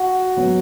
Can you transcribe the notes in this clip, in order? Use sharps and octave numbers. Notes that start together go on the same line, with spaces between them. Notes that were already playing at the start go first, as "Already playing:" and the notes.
Already playing: F#4 F#5
F#3 B3